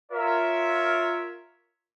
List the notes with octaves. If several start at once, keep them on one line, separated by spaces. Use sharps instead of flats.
F4 A#4 C#5 E5